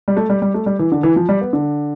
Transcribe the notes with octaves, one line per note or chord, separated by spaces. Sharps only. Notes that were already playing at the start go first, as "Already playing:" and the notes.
G3
A3
G3
G3
A3
G3
E3
D3
E3
F3
G3
B3
D3